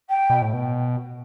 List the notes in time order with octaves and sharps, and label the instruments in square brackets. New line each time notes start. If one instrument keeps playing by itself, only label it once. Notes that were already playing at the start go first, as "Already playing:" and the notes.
[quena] G5
[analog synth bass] B2
A2
B2